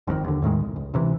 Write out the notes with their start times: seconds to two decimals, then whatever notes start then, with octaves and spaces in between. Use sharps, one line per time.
0.07 G1 F2 B2 D#3
0.24 D#2 D3
0.42 E2 A2 D#3 G#3
0.60 C2
0.76 C#2
0.94 C#2 C3 E3